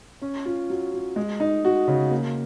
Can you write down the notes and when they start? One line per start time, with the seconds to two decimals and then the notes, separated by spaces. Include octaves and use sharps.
0.22 C#4
0.45 F4
0.70 F#3
0.94 F#3
1.16 G#3
1.40 D#4
1.65 F#4
1.88 C#3
2.11 A#3